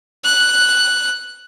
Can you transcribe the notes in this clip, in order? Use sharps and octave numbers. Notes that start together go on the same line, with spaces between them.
F#6